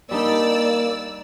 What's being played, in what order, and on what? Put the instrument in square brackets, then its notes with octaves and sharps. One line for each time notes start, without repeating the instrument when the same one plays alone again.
[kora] G3 D4 D#4 [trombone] A#3 [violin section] D5 E6